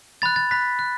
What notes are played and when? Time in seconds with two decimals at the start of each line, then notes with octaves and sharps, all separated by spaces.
0.22 B5 F#6 A6
0.36 A6
0.51 B5 F#6 B6
0.79 F#6